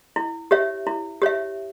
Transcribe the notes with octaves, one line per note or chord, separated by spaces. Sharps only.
E4
G4 C#5 E5
E4
G4 C#5 E5